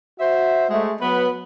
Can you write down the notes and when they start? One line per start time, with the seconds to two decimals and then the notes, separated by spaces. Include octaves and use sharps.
0.19 F#4 C5 E5
0.70 G#3 A3
1.00 F#3 B3 B4